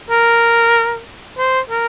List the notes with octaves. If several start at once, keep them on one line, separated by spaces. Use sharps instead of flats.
A#4
C5
A#4